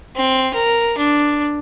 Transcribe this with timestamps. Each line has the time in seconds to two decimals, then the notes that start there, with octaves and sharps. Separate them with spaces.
0.16 C4
0.54 A#4
0.98 D4